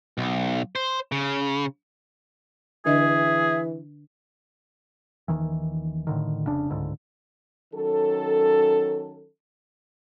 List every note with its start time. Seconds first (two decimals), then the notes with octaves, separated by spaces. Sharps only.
0.18 B1
0.75 C5
1.12 C#3
2.86 D3 E3 D4 G#4 D#5 E5
5.28 D#1 C#2 D#3 E3
6.07 A2 D3 D#3
6.47 F1 C#3 D4
6.69 D1 C#2 G#2 D3
7.74 D#3 F#3 C#4 A4